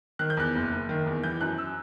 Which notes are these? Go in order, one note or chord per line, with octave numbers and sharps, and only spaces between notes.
D#3 F#6
G6
E2 F#6
F#1
F#1
D#3
E2
E3 G6
F#2 F#6
E6